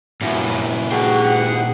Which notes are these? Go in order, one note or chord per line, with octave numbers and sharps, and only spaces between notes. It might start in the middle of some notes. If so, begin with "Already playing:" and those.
F#2 A#2 D#3 E4
F#4 G#4 G5
F#5